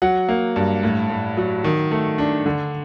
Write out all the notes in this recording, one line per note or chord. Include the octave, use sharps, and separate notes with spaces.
F#3 F#5
A#3
G2
A2
A2
F#3
D#3
A3
D4
D3